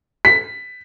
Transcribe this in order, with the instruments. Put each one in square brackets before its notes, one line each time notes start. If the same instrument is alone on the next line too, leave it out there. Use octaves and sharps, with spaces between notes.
[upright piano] B6